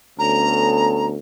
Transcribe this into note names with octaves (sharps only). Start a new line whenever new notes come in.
D2 B3 C#4 A4 A#5